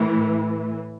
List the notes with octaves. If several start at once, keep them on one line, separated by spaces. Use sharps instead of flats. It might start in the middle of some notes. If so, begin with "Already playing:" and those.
Already playing: A2 E3